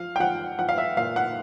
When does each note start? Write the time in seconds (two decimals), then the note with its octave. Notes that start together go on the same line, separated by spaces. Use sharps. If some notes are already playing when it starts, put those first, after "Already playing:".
Already playing: F3 F5
0.16 G5
0.20 F3 F#5
0.59 F3 F#5
0.69 F5
0.78 E5
0.97 A#2 F5
1.16 F#5